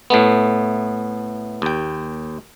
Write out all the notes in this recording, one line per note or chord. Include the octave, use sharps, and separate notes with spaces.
A2 A3 B3
D#2 G5